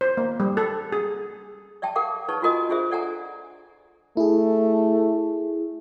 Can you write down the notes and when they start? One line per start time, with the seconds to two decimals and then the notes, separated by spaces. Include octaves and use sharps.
0.01 C5
0.17 A#3
0.40 G3
0.57 A4
0.92 G#4
1.82 D5 E5 G5 A5
1.96 G4 A#4 F5 F#5 D6
2.28 D#4 G#4 B4 C#5 A5 C#6
2.42 F4 F#4 A#4 D#5 G#5
2.69 D4 F4 G#4 C5 E5
2.91 A4 D5 F#5 G#5 A#5
4.17 A3 E4 G#4